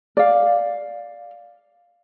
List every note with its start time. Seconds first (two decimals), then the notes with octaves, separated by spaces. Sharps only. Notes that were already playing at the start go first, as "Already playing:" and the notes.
0.17 D5 F5